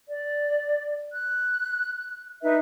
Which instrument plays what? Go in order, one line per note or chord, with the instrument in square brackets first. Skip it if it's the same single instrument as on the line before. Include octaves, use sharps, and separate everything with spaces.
[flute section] D5
F#6
D#4 B4 E5